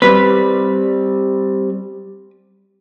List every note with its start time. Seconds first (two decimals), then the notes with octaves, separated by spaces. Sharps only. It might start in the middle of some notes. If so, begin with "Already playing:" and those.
0.02 G3 C4 B4